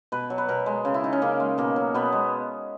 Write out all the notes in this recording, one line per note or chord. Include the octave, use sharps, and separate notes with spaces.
B2 B4
F#3
B4
B2 A#4
G#3
C#3
E4
F#3 D#4
C#4
C#3 A#3
G#3
B2 A#3
F#3
B2 B3
G#3